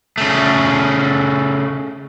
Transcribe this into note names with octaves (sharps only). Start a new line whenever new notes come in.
C#3 A3